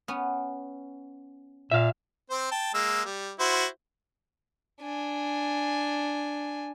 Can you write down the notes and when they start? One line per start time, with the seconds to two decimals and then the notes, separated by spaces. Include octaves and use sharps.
0.08 B3 C#4
1.71 A#2 E5 F5
2.31 C4 C5
2.52 G5 A5
2.74 G#3 A#3 E6
3.05 G3
3.39 E4 F#4 C5
4.81 D4 G#5